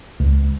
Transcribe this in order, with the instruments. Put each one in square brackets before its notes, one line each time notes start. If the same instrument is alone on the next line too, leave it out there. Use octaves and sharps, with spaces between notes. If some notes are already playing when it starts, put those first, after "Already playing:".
[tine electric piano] C#2